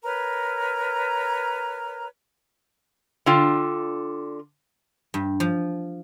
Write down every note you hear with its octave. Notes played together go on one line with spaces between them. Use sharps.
A#4 B4 C#5 A#5
D3 F4 G5
G2
F3